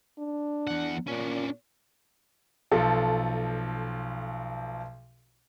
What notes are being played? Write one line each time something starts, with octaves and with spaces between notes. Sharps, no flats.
D4
E2 F#5
A#2 C#4 D4
B1 F3 A4